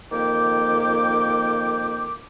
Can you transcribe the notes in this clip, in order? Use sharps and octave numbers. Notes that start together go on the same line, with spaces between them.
F2 D#3 A#3 G5 D6